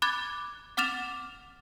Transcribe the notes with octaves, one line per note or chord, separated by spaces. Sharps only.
B5 D6 F#6 G#6 A6
F#5 D6 F6 A6 E7 F7